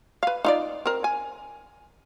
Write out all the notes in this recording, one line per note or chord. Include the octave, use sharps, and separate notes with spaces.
B4 F5
D#4 F4 D5
C4 A#4
G#5